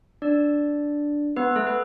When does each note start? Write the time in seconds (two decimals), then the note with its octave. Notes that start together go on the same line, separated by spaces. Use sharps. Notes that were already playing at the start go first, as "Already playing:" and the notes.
0.22 D4 D5
1.36 B3 B4
1.56 A3 A4
1.67 B4